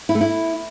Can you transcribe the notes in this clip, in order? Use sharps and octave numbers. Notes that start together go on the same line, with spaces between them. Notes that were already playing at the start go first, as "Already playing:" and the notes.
E4
A3
E4